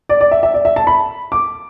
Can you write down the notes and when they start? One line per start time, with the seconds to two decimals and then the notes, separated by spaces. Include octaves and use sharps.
0.09 D5
0.21 D5
0.31 E5
0.43 E5
0.54 D5
0.65 E5
0.76 A5
0.87 B5
1.32 D6